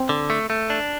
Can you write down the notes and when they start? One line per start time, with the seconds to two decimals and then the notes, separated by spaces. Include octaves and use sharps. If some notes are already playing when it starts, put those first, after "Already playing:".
Already playing: C4
0.09 D3
0.30 A3
0.50 A3
0.70 D4